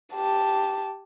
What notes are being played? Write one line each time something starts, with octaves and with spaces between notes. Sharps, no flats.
G4 A5